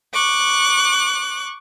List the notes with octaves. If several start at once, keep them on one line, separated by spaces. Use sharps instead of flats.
C#6 D6 F#6